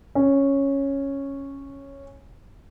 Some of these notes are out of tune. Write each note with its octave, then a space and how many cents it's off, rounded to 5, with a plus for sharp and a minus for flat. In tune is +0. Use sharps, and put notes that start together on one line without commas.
C#4 -5